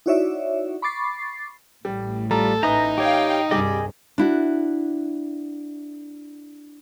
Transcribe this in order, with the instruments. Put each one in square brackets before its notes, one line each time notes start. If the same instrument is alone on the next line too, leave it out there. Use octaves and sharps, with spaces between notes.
[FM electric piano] D#4 E4 F#4 C#5 D5 E5
B5 C#6 D6 A6 C7
[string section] A1 A2 [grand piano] G3
[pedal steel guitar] G3 F4 [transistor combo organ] A4 [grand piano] A#5
[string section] A1 G6 [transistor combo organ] D#4 [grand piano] B4 E5 G#5 [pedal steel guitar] A#5 D#6
[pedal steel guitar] G4 C#5 [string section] F5 G5
[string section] C2 G2 [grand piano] G3 G5 D6 [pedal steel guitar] G#4 D#5
[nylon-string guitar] D4 E4 F#4